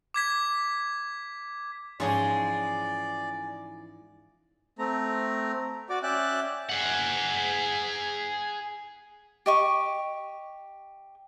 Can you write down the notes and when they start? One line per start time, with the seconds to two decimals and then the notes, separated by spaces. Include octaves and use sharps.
0.14 D6 G#6 B6
2.00 G#2 E3 F3 G#3 C#4 G#4 C#5 D5
4.79 A3 C4 A#5
5.90 F#4 D5 D6
6.03 C#4 D5 E5 G5 F#6
6.69 G#4 F#5
9.46 G4 D#5 C#6